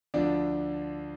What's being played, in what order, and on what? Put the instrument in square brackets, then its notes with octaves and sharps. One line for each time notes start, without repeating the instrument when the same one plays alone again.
[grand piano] D2 D3 F3 D4 D5